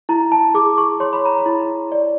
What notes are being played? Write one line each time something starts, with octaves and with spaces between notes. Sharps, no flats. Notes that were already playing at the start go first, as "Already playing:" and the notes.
E4 A#5
A5
G#4 D6
C#6
C#5 C6
B5
A#5
B5
E4
D5